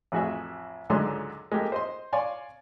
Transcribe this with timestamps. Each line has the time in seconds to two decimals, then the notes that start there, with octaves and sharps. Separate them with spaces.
0.12 A1 F2 F#4 G#4 E5
0.90 C#2 G#2 D3 F#3 G#3 C6
1.52 G#3 A#3 G4 A4
1.72 C5 D#5 C6
2.13 C#5 D5 F5 G#5 C6